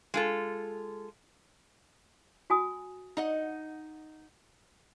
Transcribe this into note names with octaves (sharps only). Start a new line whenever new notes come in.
G#3 F4 A4
F#4 G#5 D#6
D#4 D#5 F#5